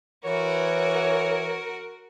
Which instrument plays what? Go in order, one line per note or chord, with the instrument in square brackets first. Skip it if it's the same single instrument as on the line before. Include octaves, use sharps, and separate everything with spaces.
[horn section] E3 C#5 [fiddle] F#4 A#4